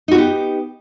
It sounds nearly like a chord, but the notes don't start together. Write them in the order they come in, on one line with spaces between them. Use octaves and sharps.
D#4 F#4 B3 G4